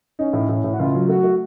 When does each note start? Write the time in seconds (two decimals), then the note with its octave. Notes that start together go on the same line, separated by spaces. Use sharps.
0.19 C#4 D#4
0.33 A2
0.49 A2
0.64 A2
0.74 F#4
0.79 C#2 F4
0.95 F#3
1.08 A3 F#4
1.23 A3